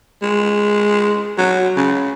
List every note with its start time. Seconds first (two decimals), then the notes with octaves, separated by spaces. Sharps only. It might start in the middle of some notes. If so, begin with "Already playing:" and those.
0.22 G#3
1.38 F#3
1.76 C#3